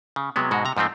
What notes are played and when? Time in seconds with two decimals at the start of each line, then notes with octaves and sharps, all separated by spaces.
0.16 C#3
0.36 C3 F#3 G#3 B3
0.51 G#2 B2 G#3 F#4
0.65 C3 A#5
0.77 G#2 F3 A3 C4